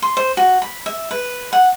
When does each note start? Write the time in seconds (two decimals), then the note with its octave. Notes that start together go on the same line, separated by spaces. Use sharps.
0.02 C6
0.17 C5
0.37 F#4
0.62 B5
0.86 E5
1.11 B4
1.53 F#5